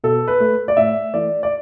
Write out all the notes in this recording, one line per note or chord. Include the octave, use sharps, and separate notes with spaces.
B2 A4
B4
A3
D5
A2 E5
E3 A3 D5
D5